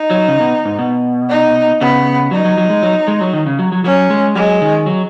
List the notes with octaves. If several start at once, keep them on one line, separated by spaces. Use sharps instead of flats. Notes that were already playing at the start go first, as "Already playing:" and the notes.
Already playing: D#4
F#3
C#3
B2
G#2
B2
D#4
C#3 B3
F#3 D#4
F#3
F#3
G#3
F#3
G#3
F#3
D#3
C#3
F#3
F#3
F#3 C#4
G#3
F#3 G#3
D#3
F#3